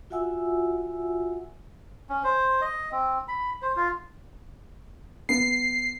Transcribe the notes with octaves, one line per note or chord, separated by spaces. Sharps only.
F4 F#4 E5 F#5 G#5 E6
C#4
C5
D#5
C4
B5
C5
F4
B3 C7